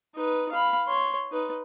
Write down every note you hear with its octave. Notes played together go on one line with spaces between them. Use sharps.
D#4 B4
F5 B5
C#5 C6
D#4 B4